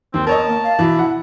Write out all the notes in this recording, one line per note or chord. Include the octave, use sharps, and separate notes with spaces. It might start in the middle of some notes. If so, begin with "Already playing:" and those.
D#2 C4
B3 A#4 C#5 D#5 A5
A#3
F5
B2 E3 E4
F#5